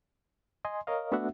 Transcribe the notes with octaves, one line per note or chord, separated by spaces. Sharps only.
D#5 G#5 C6
A#4 C#5 D#5 F5
A3 B3 D4 F#4 E5 F#5